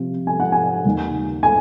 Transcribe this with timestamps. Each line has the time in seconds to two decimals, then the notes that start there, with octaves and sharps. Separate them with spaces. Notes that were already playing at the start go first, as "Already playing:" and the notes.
Already playing: C3 F3 C4
0.27 G#5
0.40 F#5
0.52 G#5
0.85 D#2 D#3 A#3 D#4
1.43 G#5